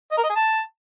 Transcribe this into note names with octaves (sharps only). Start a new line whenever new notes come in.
D#5
A#4
D#5
G#4
A5